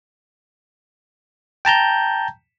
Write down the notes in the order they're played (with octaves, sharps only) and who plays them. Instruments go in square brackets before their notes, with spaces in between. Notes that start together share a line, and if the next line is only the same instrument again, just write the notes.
[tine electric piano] G5 A5 A#5 G6